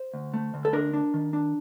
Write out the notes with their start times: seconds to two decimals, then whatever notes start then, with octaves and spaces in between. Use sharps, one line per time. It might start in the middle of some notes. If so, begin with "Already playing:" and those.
Already playing: C5
0.14 D2
0.34 A3
0.54 D2
0.65 A4
0.73 D4 A#4
0.93 D4
1.14 D#3
1.33 D4